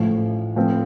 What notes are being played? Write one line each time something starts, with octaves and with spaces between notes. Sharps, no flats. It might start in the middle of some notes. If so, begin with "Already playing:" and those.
Already playing: A1 A2 F3
A2 F3 C4